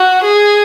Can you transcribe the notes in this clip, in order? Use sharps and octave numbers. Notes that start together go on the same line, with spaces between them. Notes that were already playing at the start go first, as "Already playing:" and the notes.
Already playing: F#4
G#4